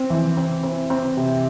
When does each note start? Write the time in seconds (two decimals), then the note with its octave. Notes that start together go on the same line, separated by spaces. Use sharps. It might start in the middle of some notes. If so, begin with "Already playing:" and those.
Already playing: C4
0.10 E3
0.37 C4
0.63 C4
0.90 C4
1.17 C3